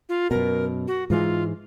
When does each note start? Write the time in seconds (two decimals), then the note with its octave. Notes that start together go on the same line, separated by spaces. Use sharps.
0.09 F4
0.31 F#2 B2 A#4
0.87 F#4
1.10 G#2 E3 G#3 F4